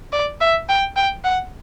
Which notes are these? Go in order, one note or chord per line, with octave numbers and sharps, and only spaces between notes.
D5
E5
G5
G5
F#5